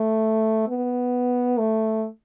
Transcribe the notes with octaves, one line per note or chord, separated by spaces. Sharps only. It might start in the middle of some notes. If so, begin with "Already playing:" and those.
Already playing: A3
B3
A3